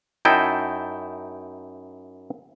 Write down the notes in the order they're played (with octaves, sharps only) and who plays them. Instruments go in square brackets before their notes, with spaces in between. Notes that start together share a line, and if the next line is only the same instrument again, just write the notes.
[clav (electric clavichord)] F#2 D#4 E4 G5 A5